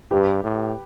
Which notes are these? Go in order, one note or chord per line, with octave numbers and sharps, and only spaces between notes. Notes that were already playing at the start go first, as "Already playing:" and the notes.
G2 G4 B4
A2